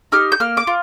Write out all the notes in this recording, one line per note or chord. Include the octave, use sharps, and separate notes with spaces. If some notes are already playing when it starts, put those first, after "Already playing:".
D#4 G4 F6
G6
A#3 F6
D6
F4